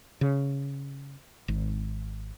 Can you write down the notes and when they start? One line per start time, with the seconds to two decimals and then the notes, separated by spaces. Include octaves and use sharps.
0.21 C#3
1.48 G#1